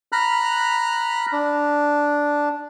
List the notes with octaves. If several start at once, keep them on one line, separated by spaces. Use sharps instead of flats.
A#5 B5 F6 F#6
D4